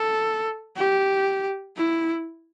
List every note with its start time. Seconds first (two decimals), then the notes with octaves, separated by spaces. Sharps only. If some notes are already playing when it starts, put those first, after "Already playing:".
Already playing: A4
0.76 G4
1.76 E4